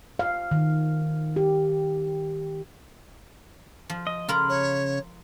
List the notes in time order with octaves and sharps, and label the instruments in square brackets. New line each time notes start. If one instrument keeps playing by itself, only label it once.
[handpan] F5
D#3
G4
[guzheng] F3
[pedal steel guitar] D#5
[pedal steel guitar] C#3 B5 F6 [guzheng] F4 A#4 A#5
[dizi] C#5